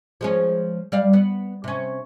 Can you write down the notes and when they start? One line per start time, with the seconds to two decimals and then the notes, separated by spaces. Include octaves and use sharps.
0.21 F3 G#3 C#4
0.92 G3 D5 F5
1.13 B3
1.64 C3 C#4